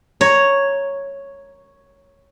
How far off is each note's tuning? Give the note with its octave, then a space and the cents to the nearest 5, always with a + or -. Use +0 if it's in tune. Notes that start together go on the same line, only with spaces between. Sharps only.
C#5 +0 A#5 +0